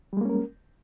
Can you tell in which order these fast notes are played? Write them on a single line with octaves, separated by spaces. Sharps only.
G3 G#3 A#3 C#4 A#4